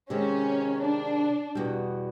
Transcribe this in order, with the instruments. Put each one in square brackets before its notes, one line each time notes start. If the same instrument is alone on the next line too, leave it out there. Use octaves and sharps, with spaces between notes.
[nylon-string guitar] C3 D#3 G#3 [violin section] C#4
[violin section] D4
[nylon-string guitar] E2 B2 G3